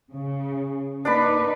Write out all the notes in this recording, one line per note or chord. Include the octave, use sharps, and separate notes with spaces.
C#3
A#3 D4 D#4 B4 D5 B5